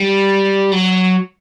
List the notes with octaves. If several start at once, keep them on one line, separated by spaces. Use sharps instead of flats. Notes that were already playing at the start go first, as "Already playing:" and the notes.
Already playing: G3
F#3